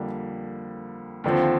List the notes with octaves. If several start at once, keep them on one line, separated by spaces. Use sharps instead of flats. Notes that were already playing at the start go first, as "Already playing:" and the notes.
Already playing: F2 D3 G3 A#3
D#2 D3 F3 C4